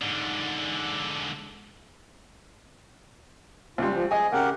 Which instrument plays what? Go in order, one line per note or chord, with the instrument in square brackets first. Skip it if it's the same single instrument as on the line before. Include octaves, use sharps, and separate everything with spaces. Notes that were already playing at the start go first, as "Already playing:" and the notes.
[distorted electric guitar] G#2 D3
[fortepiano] C#2 G3 [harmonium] F4
[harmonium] F3
[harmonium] G#4 [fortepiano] D#5 G#5
[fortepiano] C#3 [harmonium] G4 A#4 F#5